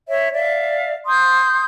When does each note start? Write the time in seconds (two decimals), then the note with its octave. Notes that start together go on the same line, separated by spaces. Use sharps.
0.08 C#5 E5
0.33 D5 E5 F5
1.06 C6 D#6 G6